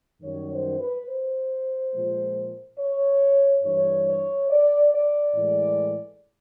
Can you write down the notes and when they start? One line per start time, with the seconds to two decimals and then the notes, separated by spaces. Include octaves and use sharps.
0.22 F#2 D#3 G3 C#5
0.51 C5
0.79 B4
1.08 C5
1.92 A#2 F3 G#3
2.78 C#5
3.64 G2 E3 G3 C#5
4.06 C#5
4.50 D5
4.92 D5
5.34 A2 E3 G#3